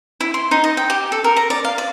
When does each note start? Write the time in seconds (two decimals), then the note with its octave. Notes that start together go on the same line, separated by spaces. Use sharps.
0.20 E4
0.34 C6
0.51 D#4
0.64 D#5
0.77 G5
0.90 G4
1.12 A4
1.24 A#4
1.36 A#5
1.50 D5
1.64 F5
1.78 D5